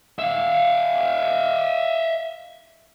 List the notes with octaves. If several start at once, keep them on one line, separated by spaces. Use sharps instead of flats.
E5 F5